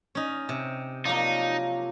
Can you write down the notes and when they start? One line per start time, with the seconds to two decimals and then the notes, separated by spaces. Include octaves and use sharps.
0.15 C#4 D#4
0.49 C3 G5
1.05 F3 F#3 A#3 D#4 A#4 D5